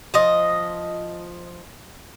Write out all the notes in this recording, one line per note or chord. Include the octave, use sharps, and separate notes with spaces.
F3 D#5